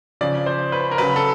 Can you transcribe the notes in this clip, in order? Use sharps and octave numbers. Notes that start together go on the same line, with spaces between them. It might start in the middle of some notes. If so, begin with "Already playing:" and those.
C#3 F3 D5
C5
B4
A#4
C#3 F#3 B4
A4